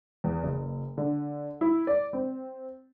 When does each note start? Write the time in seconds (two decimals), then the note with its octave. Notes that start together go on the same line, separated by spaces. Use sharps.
0.24 E2
0.43 F#1
0.98 D3
1.61 E4
1.87 D5
2.13 C4